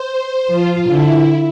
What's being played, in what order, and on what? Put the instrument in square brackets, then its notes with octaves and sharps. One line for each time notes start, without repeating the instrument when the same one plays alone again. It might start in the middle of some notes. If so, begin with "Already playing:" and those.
Already playing: [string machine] C5
[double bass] F3 [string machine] F4
[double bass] D3 [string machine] E4